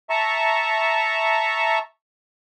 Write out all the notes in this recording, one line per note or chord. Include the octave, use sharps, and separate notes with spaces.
E5 A5 A#5 C#6